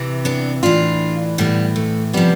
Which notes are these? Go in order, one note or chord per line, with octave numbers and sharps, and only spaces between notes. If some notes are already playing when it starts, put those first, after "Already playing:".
Already playing: C3 E3
B3 D4
A2 E3 D4 F4
A2 E3 G3 B3
A3
C3 F3 G3 B3